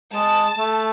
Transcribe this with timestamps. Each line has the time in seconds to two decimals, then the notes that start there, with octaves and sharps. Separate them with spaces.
0.13 G#3 A5
0.59 A3